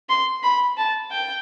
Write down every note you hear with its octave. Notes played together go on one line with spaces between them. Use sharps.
C6
B5
A5
G5